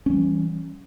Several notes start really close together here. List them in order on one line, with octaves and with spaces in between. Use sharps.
C#4 F#3 G3 E3